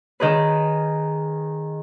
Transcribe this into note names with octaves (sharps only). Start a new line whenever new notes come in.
D#3 G#4 B4